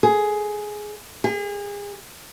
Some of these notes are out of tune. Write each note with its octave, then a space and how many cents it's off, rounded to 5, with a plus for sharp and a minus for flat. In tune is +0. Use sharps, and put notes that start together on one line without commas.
G#4 +10
G#4 -35